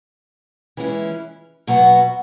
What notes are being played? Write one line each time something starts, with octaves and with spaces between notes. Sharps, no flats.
E3 G#3 C#4 E4
B2 F#3 B3 F#4